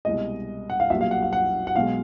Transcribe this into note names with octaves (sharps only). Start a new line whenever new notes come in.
C2 B2 G#3 D#5
F#5
F5
B1 A#2 G3 E5
F5
F#5
F5
F#5
F#5
B1 B2 G#3 F5